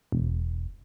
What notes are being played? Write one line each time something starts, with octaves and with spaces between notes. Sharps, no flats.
E1